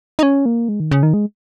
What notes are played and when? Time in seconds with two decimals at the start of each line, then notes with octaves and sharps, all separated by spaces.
0.19 D#4
0.23 C#4
0.46 A#3
0.69 G#3
0.80 D#3
0.91 C#3
1.03 D#3
1.14 G#3